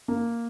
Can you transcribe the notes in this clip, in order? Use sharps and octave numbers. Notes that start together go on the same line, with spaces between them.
A#3